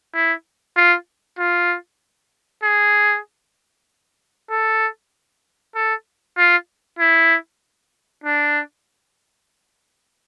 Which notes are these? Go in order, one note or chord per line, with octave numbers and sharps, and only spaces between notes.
E4
F4
F4
G#4
A4
A4
F4
E4
D4